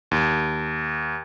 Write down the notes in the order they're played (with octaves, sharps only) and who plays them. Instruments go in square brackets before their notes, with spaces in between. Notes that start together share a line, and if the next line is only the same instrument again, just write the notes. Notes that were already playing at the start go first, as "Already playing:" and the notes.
[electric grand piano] D#2